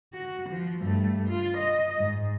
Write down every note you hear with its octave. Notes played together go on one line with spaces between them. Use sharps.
F#4
F3
G2 A3
F4
D#5
G#2